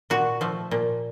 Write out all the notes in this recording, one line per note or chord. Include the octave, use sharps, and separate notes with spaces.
A#2 F#4
F3 A3
A#2